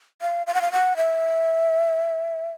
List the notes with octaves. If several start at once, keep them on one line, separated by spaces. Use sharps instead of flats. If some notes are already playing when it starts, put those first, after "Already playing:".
F5
F5
F#5
F5
F#5
E5